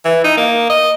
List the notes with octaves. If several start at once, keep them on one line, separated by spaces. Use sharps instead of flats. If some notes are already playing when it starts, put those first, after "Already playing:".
E3
D#4
A#3
D#5